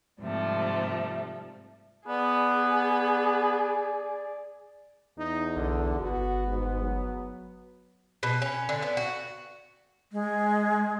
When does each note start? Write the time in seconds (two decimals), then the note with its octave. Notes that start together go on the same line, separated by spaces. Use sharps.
0.20 G#2 C3 F3 G3 A3
2.08 B3 G#4 D5
5.18 E2 D#4
5.56 B1 D3
6.00 G1 B3 F#4
6.47 G#2
6.83 F#3
8.23 B2
8.42 C#4
8.69 D3
8.82 B3
8.97 F#4
10.12 G#3